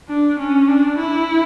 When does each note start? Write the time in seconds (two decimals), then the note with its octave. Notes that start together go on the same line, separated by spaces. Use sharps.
0.09 D4
0.39 C#4
0.68 D4
0.98 E4